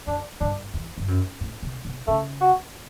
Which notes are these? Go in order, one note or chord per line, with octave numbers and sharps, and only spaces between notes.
F#2 D4
G2 D4
E2
G2
F#2
A2
B2
B2
C#3 A3
F#4